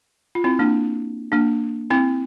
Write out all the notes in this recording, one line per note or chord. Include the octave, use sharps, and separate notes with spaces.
F4
C4 E4
A#3 D4
A#3 D4
C4 E4